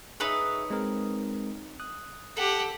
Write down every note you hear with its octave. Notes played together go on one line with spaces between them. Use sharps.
D#4 G#4 B4 C#5 E5
G#3 C4 A#4
D#6 F#6
G4 A4 F#5